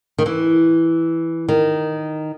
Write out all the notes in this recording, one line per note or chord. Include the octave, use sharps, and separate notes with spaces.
D#3
E3
D#3